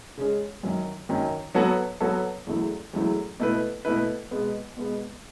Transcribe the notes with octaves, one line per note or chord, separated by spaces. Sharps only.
C#3 G#3 C#4 G#4
F#2 D#3 F#3 C#4
F#2 D#3 F#3 C#4
F#3 B3 F#4 A4 C#5
F#3 B3 F#4 A4 C#5
E2 C#3 F#3 A3 E4
E2 C#3 F#3 A3 E4
B2 A3 E4 B4
B2 A3 E4 B4
B2 G#3 B3
B2 G#3 B3